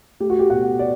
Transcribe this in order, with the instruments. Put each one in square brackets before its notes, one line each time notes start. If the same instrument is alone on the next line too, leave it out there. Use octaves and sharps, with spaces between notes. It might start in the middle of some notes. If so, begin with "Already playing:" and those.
[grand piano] A3 G4
F#4
G4
B2 F#5
D5